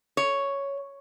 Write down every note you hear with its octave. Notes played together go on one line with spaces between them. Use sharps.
C#5